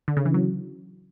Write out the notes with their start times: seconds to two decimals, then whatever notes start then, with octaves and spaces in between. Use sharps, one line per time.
0.08 D3
0.17 C#3
0.25 E3
0.34 F#3